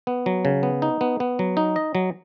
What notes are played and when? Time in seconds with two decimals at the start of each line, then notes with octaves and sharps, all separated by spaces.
0.07 B3
0.26 F#3
0.45 C#3
0.63 B3
0.82 D#4
1.01 B3
1.20 B3
1.39 F#3
1.57 D#4
1.76 D#5
1.95 F#3